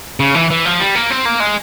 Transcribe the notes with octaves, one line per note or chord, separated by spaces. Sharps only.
C#3
E3
E3
F3
G3
A#3
C4
A#3
G#3